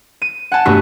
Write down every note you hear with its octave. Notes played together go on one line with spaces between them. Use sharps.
D#7
F#5 G#5 A5
G2 A3 B3 F#4 C#6 B6